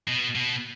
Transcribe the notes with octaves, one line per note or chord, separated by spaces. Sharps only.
B2
B2